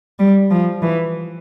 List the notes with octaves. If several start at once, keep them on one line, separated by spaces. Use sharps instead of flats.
G3
F3
E3